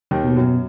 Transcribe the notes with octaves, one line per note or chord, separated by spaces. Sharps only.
D#2 D#3
B2
F#2 F#3